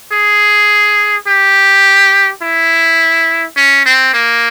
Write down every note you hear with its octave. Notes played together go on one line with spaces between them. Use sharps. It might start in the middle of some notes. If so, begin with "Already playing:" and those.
G#4
G4
E4
C#4
C4
A#3